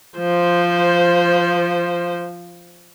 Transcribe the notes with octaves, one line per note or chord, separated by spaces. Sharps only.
F3 C5